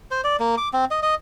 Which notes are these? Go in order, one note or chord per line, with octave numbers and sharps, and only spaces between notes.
C5
D5
A#3
D6
C4
D#5
D#5